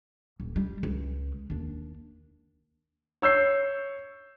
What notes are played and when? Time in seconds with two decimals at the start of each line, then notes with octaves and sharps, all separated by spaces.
0.40 D#1
0.56 G3
0.83 C#2
1.50 D#2 D4
3.22 C#5 E6 G6 C7